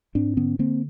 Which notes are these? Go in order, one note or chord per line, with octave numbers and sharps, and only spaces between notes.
G#2 C4 D4
D3 B3 C#4
D3 A#3 C4